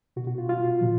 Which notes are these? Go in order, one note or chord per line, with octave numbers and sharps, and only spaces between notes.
B2 F#4
F#4
F4
F4
A#2 F3